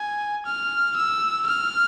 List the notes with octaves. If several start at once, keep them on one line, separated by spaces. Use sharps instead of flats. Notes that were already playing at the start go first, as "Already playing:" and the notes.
Already playing: G#5
F6
E6
F6